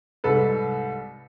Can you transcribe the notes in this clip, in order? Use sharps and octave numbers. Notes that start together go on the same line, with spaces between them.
C2 G#2 A4 B4